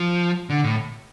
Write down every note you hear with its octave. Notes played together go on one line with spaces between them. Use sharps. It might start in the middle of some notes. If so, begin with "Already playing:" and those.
Already playing: F3
D3
A2